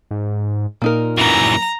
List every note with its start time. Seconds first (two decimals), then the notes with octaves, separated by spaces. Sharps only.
0.11 G#2
0.82 A#2 A#3 D#4 A#4
1.18 F#2 E3 A#5